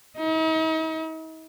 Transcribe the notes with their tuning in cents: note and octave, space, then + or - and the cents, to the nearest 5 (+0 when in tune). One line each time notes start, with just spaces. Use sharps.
D#4 +45